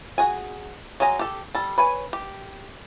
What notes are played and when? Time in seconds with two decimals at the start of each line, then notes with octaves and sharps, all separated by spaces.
0.18 F#4 G#4 G#5
1.00 F#3 G#3 D#5 G#5 A#5
1.19 G4 A4
1.54 G3 A4
1.78 B4 C#5 G#5
2.13 G4